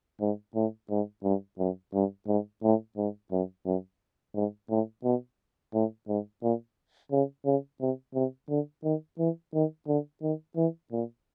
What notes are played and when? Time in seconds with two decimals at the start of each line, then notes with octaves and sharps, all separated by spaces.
0.21 G#2
0.55 A2
0.90 G#2
1.24 G2
1.59 F#2
1.94 G2
2.27 G#2
2.63 A2
2.97 G#2
3.32 F#2
3.65 F#2
4.35 G#2
4.70 A2
5.04 B2
5.74 A2
6.08 G#2
6.43 A#2
7.12 C#3
7.45 C#3
7.81 C3
8.15 C3
8.49 D3
8.84 D#3
9.19 E3
9.54 D#3
9.88 D3
10.22 D#3
10.56 E3
10.92 A#2